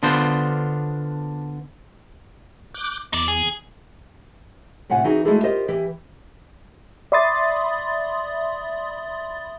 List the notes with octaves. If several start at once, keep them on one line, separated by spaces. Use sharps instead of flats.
D3 B3 D4 F4 C5
D6 F#6 G6
E2 D#4 D5
G#4
A2 C3 F4 F#5 G#5
E3 D#4 F#4 G#4
G#3 A3 E4 F#4 G#4 A4
F4 G4 A#4 C5 D#5
E3 G4
D5 E5 B5 C6 D#6 A6